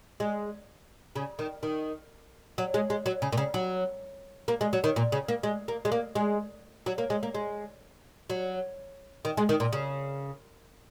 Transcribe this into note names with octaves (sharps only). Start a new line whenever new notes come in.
G#3
C#3
D#3
D#3
F#3
G#3
G#3
F#3
C#3
A#2
C#3
F#3
A#3
G#3
F#3
D#3
A#2
C#3
A#3
G#3
A#3
G#3
A#3
G#3
F#3
A#3
G#3
A#3
G#3
F#3
D#3
G#3
D#3
A#2
C#3